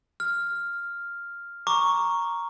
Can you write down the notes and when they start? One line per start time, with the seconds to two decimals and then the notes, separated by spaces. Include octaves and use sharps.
0.20 F6
1.67 A#5 C#6 D6